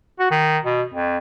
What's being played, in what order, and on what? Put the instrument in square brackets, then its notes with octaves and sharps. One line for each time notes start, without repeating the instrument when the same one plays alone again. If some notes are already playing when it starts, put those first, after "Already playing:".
[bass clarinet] F#4
D#3
B2
F2